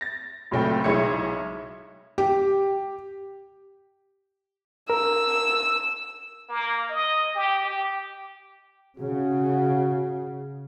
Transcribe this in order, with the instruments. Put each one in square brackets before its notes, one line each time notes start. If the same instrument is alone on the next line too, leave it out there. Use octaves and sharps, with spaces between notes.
[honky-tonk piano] A6 A#6
C#2 A#2 F#3 A3 C4 G5
B1 G#3 E4 C#5 G#6 C#7
[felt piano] G4
[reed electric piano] A#4 [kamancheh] E6
[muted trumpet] A#3
D#5
G4
G4
[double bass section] C#3 [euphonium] F#4